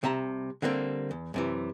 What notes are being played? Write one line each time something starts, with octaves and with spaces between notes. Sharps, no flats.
C2 C3 E5 A5 A#5
D3 G3 A#3 C4 A4
E2
F#2 C3 E3